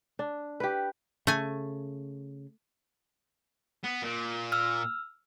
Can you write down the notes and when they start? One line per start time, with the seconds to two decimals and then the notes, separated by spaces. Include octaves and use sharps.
0.19 D4
0.60 G4 B4
1.27 C#3 A3 G#5
3.83 B3
4.02 A#2
4.52 E6 F6